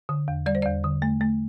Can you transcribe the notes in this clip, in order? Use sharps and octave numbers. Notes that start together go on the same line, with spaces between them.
D3
E2
G3 D5
C5
E2 D5
D3
A3
A3